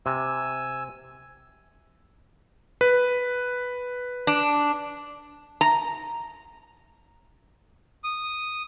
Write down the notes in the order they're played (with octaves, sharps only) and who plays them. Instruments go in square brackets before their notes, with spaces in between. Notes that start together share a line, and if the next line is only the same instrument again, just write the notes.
[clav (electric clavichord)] C3 [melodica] G#5 E6
[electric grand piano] B4
[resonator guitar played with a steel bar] D4
A#5
[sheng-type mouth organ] D#6